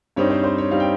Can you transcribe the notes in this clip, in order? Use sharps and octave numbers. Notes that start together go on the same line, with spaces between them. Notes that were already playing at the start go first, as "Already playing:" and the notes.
G2 G3 C4 D#4 C#5
C5
C5
C#5
G3 C4 D#4 F5
G5